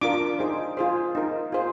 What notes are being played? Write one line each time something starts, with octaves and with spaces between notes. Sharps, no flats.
D4 F4 A#4 D6
D#4 G#4 C5
F4 G#4 C5
D#4 A#4
F4 G#4 C5